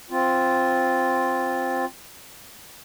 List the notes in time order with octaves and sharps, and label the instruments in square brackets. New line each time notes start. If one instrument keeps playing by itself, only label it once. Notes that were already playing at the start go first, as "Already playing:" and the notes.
[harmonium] C4 F4